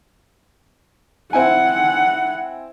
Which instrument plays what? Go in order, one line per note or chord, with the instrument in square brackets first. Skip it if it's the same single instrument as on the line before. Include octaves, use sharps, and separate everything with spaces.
[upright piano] C4 E4 G#5 [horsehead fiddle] F#5